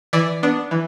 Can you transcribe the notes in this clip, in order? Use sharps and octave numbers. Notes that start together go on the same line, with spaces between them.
E3 D5
B3 D4
E3